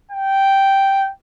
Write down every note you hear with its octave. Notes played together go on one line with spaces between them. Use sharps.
G5